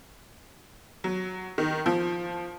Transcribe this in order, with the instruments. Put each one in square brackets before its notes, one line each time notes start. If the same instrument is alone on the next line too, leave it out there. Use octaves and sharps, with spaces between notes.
[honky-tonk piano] F#3
D#3
F3